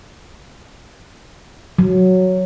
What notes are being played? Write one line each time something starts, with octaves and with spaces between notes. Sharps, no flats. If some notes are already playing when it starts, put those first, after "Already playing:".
F#3